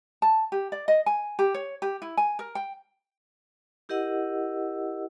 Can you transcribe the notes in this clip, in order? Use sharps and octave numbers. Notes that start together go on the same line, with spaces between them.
A5
G4
D5
D#5
G#5
G4
C#5
G4
E4
G#5
A#4
G5
E4 G4 A#4 D#5 F#5 E6